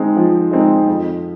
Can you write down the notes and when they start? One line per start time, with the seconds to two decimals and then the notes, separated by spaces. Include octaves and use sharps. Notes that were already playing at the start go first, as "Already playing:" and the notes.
Already playing: G#3 C4 D#4
0.17 F3
0.51 G#3 C4 D#4
0.87 F2